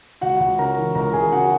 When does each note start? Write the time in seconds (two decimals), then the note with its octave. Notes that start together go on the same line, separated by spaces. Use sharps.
0.21 C#2 F#4 F#5
0.40 C#2
0.59 C#3 A#4 A#5
0.78 E3
0.95 C#2 A#4 A#5
1.13 C#2 G#4 G#5
1.32 C#3 F#4 F#5